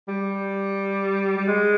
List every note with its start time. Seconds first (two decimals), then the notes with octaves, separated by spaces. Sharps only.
0.08 G3
1.37 G3
1.48 G#3